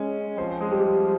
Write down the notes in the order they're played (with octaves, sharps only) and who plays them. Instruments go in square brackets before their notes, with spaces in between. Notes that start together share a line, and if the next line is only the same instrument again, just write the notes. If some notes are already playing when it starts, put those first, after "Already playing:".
Already playing: [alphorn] G#3 [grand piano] C#4
[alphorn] F3 [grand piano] C4 C5
[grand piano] G#3 G#4
G3 G4
G3 G4